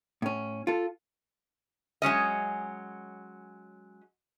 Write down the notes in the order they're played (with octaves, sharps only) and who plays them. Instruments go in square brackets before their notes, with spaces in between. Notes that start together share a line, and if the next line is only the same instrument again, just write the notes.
[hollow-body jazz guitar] A2 C#4
F4 A4
[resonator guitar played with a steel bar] F#3 G#3 C#4 D#5